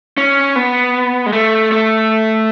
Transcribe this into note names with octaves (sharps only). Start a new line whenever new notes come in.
C#4
B3
G#3
A3
A3